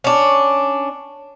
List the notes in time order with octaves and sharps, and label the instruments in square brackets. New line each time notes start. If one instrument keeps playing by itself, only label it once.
[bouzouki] C#4 D4